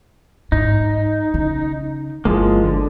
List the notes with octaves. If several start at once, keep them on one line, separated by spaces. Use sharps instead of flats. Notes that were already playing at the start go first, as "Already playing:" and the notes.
G#2 D#4
C#3
G1 F3 G#3 A#3 E4
D3